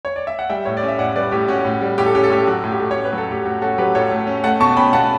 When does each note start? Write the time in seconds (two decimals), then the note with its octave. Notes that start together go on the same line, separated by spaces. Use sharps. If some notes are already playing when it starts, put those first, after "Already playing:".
0.05 C#5
0.16 D5
0.27 E5
0.39 F#5
0.50 G3 E5 G5
0.65 A2 C#5
0.77 D5
0.83 C#4
0.88 E5
0.99 A2 D5 F#5
1.16 G3 B4 D5
1.32 A2 G4
1.48 C#4 F#4
1.65 A2
1.82 G3
1.98 A2 G4
2.06 A4
2.15 C#4 G4
2.24 A4
2.30 A2 G4
2.47 F#3 F#4
2.64 A2
2.72 G4
2.80 A3
2.91 C#5
2.96 C#4
3.05 B4
3.13 F#3
3.18 A4
3.29 A2 G4
3.45 A3 F#4
3.62 C#4 F#4 A4
3.78 F#3 G4 B4
3.95 A2 A4 C#5
4.11 A3
4.27 C#4
4.44 A3 F#5 A5
4.60 B2 A5 C#6
4.77 C#4 G5 B5
4.93 B2 F#5 A5